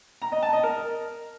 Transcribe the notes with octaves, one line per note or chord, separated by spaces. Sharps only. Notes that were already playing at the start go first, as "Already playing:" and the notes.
A#5
D#5
A5
D#5
A#4